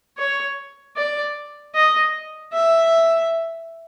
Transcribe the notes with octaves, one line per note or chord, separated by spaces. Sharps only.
C#5
D5
D#5
E5